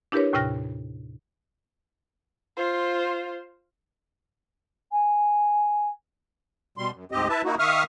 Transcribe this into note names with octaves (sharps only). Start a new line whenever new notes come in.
D4 E4 G4 A#4 B4 C#5
D#2 A2 C3 G5 F6 A#6
F4 C5
G#5
B2 G3 C6
F#2
D2 G#2 C4 G4 D#5
E4 B4 E5 A5
A#3 D#4 E4 F#4
D#3 E5 F5 C#6 D#6 F6